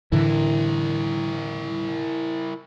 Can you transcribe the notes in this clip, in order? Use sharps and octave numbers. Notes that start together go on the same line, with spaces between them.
A2 D3 E3 E4 A#4